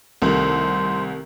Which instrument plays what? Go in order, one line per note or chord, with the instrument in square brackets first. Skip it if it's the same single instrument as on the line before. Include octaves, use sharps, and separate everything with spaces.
[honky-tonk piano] C2 [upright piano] C3 D#3 A3 [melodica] C5